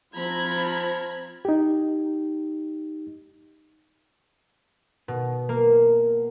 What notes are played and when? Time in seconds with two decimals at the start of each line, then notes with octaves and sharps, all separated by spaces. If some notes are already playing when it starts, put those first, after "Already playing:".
0.16 F3 C4 F4 A#5 B5 G#6
1.45 D#4 G4
5.08 B2
5.49 A#3